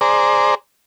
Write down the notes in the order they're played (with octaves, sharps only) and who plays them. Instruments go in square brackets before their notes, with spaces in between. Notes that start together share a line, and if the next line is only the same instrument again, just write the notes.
[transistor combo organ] G#4 C5 D5 A#5